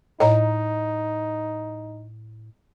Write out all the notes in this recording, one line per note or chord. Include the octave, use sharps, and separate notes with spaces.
A2 D#4 D#5 A#5